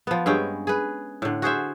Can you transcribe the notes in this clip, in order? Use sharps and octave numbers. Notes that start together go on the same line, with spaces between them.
F3 B3
G2 G#3 C#4 G5
G#4 B4
A2 D3
F#4 G#4 C5 E5